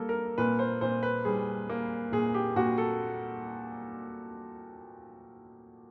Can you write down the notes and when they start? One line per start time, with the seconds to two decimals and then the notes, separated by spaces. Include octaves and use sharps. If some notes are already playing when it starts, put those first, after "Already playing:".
Already playing: G3 A#3 A4
0.09 A#4
0.38 A#2 B4
0.59 C5
0.81 A#2 C5
1.03 B4
1.25 G3 G#4
1.69 A#3
2.12 A#2 G#4
2.34 G4
2.56 A#2 F#4
2.78 A4